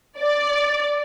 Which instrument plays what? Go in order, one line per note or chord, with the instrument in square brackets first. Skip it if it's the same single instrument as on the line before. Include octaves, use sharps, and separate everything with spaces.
[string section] D5